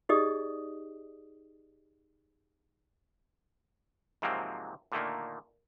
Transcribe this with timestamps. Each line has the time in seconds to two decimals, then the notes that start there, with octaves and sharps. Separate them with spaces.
0.09 D#4 G4 G#4 D5 D#5 D#6
4.22 G#2 C3 F3 F#3 A#3 C4
4.92 A#2 D3 D#3 A3 A#3